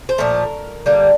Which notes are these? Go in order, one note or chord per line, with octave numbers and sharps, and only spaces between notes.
C5
A#2 F3 A3 A#4
D3 G3 A#3